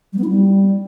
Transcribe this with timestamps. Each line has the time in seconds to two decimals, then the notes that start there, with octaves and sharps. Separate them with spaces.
0.13 G3
0.18 B3
0.24 E4
0.29 G3